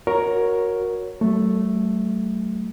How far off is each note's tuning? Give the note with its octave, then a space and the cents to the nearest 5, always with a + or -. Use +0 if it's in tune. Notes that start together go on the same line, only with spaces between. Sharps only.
F#4 -10 A#4 +10 C#5 +0
F#3 +45 A3 +0